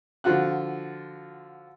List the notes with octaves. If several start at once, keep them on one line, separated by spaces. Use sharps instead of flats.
D3 F3 F4 F#4 F#6